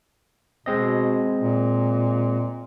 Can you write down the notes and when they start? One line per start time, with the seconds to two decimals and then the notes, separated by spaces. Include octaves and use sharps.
0.66 B2 G#3 C4 D#5
1.40 A#2